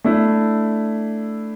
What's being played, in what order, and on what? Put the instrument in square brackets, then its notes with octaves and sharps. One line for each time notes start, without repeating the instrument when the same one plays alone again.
[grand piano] A3 D4 E4